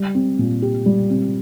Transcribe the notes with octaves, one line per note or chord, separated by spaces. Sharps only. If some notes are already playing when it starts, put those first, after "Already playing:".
Already playing: G3
C4
A#2
G4
G3
C4